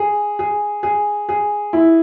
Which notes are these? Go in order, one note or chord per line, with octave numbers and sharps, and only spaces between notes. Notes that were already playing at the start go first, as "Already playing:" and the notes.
Already playing: G#4
G#4
G#4
G#4
E4